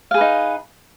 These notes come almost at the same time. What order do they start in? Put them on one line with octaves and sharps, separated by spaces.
F5 G#4 B4 D#4